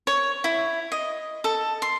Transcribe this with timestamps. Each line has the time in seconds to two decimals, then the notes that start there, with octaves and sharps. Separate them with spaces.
0.07 C#5
0.44 E4
0.92 D#5
1.44 A4
1.82 C6